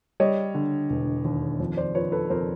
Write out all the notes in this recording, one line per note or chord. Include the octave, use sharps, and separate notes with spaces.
G3 C#5 D#5
D3
E1
D#2
F2
C5 D5
F3 B4 C#5
A4 B4
F2 A#4 C5